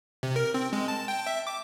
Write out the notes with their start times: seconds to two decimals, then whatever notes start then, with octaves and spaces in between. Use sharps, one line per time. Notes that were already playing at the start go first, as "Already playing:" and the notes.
0.23 C3
0.36 A#4
0.54 C4
0.73 G#3
0.88 A5
1.08 G5
1.26 E5
1.47 D6